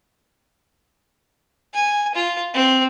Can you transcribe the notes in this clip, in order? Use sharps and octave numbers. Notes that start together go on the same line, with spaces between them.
G#5
F4
C4